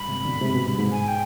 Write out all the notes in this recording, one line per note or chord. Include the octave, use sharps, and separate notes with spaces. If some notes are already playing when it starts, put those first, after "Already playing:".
Already playing: G2 B5
G#2 C3
B2 D3
G#2 C3
B2
G2
G#2
G#5
G5